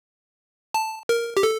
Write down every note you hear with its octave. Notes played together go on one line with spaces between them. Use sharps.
A5
A#4
G4
A4